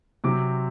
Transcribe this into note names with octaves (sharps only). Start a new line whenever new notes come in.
C3 F#3 C4 D6